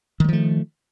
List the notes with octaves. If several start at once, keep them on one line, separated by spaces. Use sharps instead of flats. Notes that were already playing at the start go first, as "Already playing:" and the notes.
D#3 F3 G3 A3